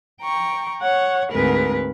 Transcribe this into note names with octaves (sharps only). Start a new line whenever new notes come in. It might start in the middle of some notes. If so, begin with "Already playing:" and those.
G5 A#5 C#6
C#5 F#5 C#6
D2 G#2 C4 G#4 A#4 B4